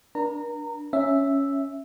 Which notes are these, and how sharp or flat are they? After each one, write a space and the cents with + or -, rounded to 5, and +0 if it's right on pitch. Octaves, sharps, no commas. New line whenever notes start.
D4 +0 A#4 +45 A#5 -25
C#4 +0 E5 +0